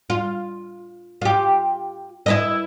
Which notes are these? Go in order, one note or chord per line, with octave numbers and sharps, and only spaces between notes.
F4
F4 G4
E4 B4 D#5